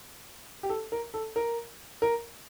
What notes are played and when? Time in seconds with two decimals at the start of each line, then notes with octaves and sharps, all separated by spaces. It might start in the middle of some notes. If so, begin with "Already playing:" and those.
0.63 G4
0.70 A4
0.92 A#4
1.14 A4
1.36 A#4
2.02 A#4